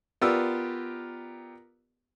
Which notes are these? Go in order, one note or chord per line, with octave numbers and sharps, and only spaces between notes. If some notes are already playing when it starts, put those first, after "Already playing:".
B3 F4 G4 A#4 D5 E6